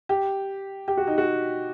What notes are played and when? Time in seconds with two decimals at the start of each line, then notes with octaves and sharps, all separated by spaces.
0.09 G4
0.88 G4
0.97 F#4
1.07 D#4
1.18 F#4